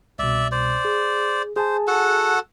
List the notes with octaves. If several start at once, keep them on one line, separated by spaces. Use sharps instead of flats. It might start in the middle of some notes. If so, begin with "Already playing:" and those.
C2 B2 D5 E5
C5 D5
G#4
G#4 C5 G#5 A5
F#4 A4 F#5